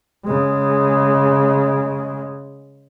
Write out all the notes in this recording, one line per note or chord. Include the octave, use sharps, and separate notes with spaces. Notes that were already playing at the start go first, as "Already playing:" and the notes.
C#3 G#3